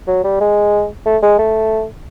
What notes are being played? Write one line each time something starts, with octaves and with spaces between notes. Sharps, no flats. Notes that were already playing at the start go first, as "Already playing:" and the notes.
F#3
G3
G#3
A3
G#3
A3